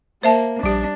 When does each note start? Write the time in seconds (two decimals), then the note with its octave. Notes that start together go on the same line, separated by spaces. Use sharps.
0.23 A#3 C5 E5 A5
0.63 A#1 G3 D4 G4